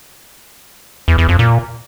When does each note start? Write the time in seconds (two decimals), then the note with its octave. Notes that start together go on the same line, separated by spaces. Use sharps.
1.08 E2
1.18 E2
1.29 F2
1.39 A#2